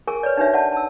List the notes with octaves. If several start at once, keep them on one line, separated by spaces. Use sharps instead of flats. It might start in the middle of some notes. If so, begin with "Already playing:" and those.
G#4 A#4 G#5 C#6
B4 C#5 D5
D4 D#4 G4 B4 C#5 E5
D5 F#5 A5
A5 E6